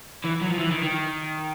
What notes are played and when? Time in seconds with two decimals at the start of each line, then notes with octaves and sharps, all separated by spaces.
0.24 E3
0.41 F#3
0.50 F3
0.59 E3
0.71 D#3
0.82 D#3